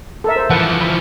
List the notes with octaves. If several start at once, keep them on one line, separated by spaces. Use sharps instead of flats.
A4 A#4 E5
C5
E3 F3 B4 F#5 A5
B5